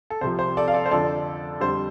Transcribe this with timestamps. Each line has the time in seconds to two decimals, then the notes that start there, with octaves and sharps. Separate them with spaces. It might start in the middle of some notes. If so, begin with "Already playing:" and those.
0.10 A4
0.21 C2 C3 F3 C5
0.39 C5
0.57 A4 D5
0.68 F5
0.74 A4 D5
0.86 C5
0.91 F2 D3 F3 A4 D5
1.60 F2 D3 G3 C5